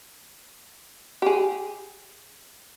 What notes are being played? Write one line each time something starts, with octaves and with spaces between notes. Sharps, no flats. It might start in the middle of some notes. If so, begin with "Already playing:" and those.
G4 G#4